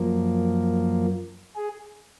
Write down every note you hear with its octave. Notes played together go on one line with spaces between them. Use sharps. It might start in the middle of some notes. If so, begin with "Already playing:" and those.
Already playing: F#2 F3 A#3
G#4